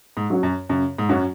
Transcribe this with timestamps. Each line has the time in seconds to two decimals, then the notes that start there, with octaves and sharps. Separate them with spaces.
0.17 G#2
0.30 F#3 C#4 F#4
0.43 F#2
0.69 F#2 C#3
0.98 G#2
1.09 F#2 F#3 C#4 F#4